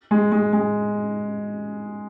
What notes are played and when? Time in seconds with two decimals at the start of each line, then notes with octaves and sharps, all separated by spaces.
0.11 G#3
0.32 G#3
0.53 G#3